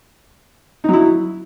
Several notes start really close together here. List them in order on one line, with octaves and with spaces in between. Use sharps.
D#4 F#3 E4